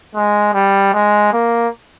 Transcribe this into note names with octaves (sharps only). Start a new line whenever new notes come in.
G#3
G3
G#3
A#3